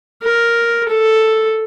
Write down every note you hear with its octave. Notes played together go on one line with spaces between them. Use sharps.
A#4
A4